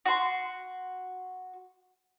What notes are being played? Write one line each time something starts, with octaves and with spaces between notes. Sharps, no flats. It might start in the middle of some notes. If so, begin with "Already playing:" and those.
F#4 C6